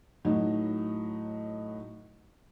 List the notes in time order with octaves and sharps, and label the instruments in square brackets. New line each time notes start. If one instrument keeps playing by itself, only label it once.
[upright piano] A2 F#3 D#4